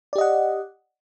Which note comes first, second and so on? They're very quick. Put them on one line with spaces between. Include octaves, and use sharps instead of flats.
D5 G4 D#5 F#5